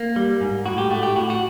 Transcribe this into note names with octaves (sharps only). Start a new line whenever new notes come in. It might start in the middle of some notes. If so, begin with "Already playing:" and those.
Already playing: A#3
G3
G#2
A2 F#4
G4
A3 F#4
G4
A2 F#4
F#4